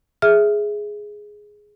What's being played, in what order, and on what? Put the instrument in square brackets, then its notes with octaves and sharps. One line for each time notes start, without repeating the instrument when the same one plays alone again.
[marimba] G#4 E5 F6